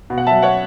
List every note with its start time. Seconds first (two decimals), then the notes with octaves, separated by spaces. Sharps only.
0.10 B2
0.18 F#5
0.27 E5 A5
0.32 F#3
0.43 C#5 F#5